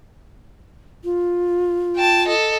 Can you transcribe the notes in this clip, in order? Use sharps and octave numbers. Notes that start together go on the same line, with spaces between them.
F4
G5 A5
A4 D#5